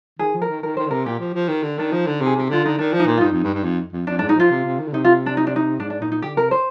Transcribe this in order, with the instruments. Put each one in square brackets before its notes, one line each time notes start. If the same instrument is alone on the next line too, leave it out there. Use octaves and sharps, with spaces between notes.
[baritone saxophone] D#3 [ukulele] G#4
[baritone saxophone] F3
[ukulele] A#4
[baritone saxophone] D#3
[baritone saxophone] D#3 [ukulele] A#4
[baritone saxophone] D#3 [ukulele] C5
[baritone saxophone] D3
[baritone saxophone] C3 [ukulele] A#4
[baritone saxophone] A#2 [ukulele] G4
[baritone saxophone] F3
F3
D#3
D3
[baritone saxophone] D#3 [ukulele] D4
[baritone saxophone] F3 [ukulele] D#4
[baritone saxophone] D3
[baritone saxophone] C3 [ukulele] G#4
[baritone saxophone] C3 [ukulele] G4
[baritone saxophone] D3 [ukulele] F4
[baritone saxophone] D3 [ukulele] D#4
[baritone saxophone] D#3 [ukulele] D4
[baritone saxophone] F3
[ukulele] D#4
[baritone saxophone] A#2
[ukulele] F4
[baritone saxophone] G2 [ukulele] D#4
[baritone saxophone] F2
G2
G2
F2
F2
[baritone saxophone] F2 [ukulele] D4
[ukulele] D4
[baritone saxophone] G#2
[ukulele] D#4
[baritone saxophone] F3 [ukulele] F4
[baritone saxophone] C3
C3
D#3
D3
[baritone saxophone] C3 [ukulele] D#4
[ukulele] F4
D4
D#4
D4
D#4
[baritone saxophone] G#2 [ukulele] D4
[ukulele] D4
[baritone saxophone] A#2 [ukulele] D#4
[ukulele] D#4
[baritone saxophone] D3 [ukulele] G4
[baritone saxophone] C3 [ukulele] A#4
[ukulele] C5